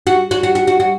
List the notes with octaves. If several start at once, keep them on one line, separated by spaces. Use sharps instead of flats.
F#4
F#4
F#4
F#4
F#4
F#4